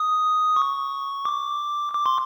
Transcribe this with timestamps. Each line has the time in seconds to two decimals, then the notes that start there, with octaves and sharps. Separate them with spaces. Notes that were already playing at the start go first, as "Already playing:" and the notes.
Already playing: D#6
0.56 C#6
1.25 D6
1.94 D6
2.06 C6